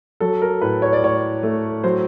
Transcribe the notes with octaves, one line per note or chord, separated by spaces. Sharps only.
F#3 A4
A#4
A2 B4
C#5
D5
A2 C#5
A3
F#3 C5